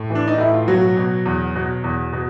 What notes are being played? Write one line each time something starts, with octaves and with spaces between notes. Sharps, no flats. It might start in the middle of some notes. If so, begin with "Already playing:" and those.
Already playing: A2
E3
D4
D#4
A2 E4
F4
B2 F#3 F#4
B2
E2
B2
E2
B2